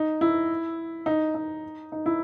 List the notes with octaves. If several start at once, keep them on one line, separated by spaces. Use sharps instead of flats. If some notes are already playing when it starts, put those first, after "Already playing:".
Already playing: D#4
E4
D#4
D#4
D#4
E4